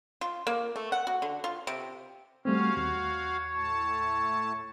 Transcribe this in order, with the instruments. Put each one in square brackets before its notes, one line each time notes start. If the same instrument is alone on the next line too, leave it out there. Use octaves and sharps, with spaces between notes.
[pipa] F4
A#3
A3
F#5
F#4
D3
F4
C3
[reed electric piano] G3 A3 C4 [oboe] C#4 [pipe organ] F#4 F5
[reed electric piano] D#2 [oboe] C#5
[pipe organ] A2 A3 A5